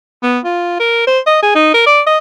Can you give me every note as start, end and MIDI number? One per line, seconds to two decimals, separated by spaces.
0.23 0.39 59
0.44 0.78 65
0.80 1.06 70
1.07 1.19 72
1.26 1.39 75
1.42 1.52 68
1.55 1.73 63
1.74 1.85 70
1.86 2.01 74
2.06 2.17 75